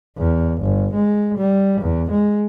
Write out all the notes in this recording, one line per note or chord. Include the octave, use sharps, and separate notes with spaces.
E2
G1
G#3
G3
E2
G#3